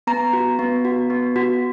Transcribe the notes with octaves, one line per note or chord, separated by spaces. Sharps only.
B3 A#5
F#4
B3
F#4
B3
F#4